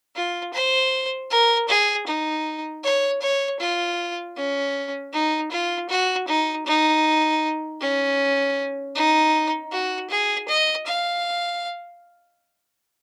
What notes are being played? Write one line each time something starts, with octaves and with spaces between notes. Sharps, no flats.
F4
C5
A#4
G#4
D#4
C#5
C#5
F4
C#4
D#4
F4
F#4
D#4
D#4
C#4
D#4
F#4
G#4
D#5
F5